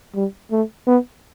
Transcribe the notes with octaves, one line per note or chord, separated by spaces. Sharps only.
G3
A3
B3